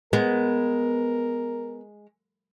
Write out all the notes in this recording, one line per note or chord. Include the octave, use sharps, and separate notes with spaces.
G#3 B3 A#4